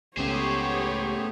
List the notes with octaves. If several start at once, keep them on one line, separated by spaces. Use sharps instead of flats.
C#2 C#3 A3 B3 G4 G#4 C5 C#5